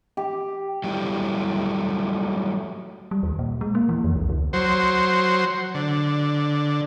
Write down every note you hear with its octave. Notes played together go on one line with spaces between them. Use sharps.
G4
F#3 G3 A3 E4 G4
G3
D#2
A#2
G#3
A#3
E3
F2
C2
D2
F#3 C5
D3